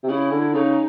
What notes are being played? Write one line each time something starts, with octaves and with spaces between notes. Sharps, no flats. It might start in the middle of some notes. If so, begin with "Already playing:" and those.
C3
C#3 E4
D3
C#3 D#4